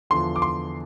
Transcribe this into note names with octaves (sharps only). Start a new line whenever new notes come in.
E2 D3 F3 C6
D6
C6